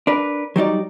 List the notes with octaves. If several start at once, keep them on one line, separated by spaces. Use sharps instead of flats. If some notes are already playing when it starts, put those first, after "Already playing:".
D4 A#4 B4
F#3 G3 D#4 D5